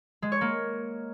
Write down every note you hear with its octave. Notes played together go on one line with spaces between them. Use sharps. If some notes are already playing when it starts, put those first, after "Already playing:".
G#3
C#5
A#3